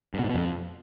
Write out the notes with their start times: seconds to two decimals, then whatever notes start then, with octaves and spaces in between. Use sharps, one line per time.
0.14 G2
0.19 B2
0.24 G#2
0.29 B2
0.35 F2